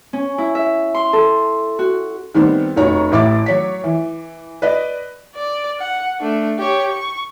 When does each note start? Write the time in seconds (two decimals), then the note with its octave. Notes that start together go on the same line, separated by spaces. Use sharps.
0.13 C#4
0.38 E4
0.55 E5
0.94 C6
1.13 A4
1.79 F#4
2.34 D#3 G3 B3 C4
2.76 F1 C#4 F#4 C#5 A#5
3.11 A1 E4 D6 A6
3.46 F#3 C#5 B6
3.84 E3
4.62 B4 D5 D#5
5.35 D5
5.79 F#5
6.20 A3 D4
6.59 G4 C#5
6.91 C#6